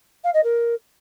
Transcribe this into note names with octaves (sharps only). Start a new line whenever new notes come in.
F5
D#5
A#4